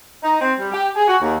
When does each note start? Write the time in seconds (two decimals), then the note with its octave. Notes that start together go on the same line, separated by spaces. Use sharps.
0.23 D#4
0.41 C4
0.58 G3
0.72 G4
0.96 G#4
1.08 F#4
1.22 D#2